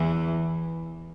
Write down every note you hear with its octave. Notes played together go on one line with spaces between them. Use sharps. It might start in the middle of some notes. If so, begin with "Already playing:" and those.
Already playing: E2 E3